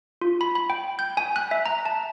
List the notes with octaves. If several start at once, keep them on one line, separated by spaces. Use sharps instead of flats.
F4
B5
B5
G5
G6
G#5
F#6
E5
A#5
A5